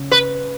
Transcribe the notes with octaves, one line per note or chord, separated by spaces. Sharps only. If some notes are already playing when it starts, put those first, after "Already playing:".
Already playing: C#3
B4